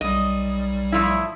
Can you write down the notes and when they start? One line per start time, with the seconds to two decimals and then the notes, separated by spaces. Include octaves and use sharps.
0.01 B1 G3 D#5
0.92 A2 F3 E4